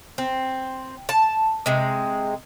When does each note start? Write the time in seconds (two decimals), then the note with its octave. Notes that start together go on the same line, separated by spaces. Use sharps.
0.18 C4
1.09 A5
1.66 C3 G#3